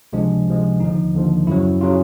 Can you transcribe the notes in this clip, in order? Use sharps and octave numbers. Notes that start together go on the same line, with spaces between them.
C#2 C3 F3 G#3 D4
C#2 C3 F3 G#3
D#2 D3 F3 D#4
D#2 D3 F3
F#2 C#3 F#3 E4
C#3 F#3 F4